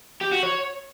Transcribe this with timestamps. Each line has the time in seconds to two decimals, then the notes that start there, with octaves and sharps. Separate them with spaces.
0.21 G4
0.32 F#4
0.43 C#5